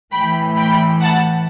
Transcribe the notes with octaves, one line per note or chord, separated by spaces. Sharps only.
A2 E3 G5 B5
G5 B5
F#5 A5